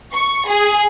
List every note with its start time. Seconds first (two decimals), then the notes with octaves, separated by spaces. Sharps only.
0.14 C#6
0.48 G#4